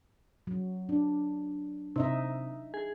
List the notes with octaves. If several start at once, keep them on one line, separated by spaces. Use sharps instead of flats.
F#3
D4
C3 D#4 D#5 E5
G#4